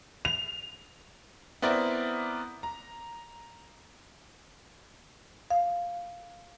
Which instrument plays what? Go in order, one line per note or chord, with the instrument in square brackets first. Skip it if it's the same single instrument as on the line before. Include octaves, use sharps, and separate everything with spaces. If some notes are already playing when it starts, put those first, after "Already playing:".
[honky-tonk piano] F7
[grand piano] B3 C4 E4 A#4 D5 E5
A#5
[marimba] F5